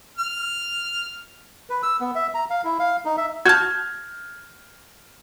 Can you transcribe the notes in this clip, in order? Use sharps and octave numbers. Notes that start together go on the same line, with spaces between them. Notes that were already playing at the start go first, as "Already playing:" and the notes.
F6
B4
E6
B3
E5
A#5
F5
E4
F5
D#4
E5
F#4 A5 F6 G6 G#6